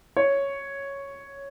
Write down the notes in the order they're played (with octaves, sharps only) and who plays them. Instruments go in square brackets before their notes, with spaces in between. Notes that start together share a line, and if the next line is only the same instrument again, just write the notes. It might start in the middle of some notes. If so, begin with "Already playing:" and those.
[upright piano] C#5